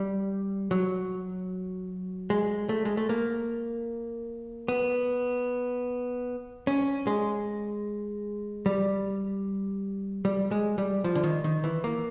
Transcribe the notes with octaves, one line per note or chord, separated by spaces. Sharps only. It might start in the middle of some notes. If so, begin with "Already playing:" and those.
Already playing: G3
F#3
G#3
A3
G#3
A3
A#3
B3
C#4
G#3
G3
G3
G#3
G3
F3
D3
D#3
D#3
E3
A#3